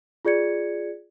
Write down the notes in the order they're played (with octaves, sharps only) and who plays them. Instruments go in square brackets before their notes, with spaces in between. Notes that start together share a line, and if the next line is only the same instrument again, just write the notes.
[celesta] F4 G#4 D5 G#6 C#7